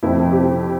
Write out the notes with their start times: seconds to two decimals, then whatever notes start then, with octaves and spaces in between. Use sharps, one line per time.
0.03 F2 E4
0.16 F3
0.31 C3 G4
0.45 C3